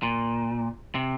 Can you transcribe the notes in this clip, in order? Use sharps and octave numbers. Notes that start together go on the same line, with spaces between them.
A#2
C3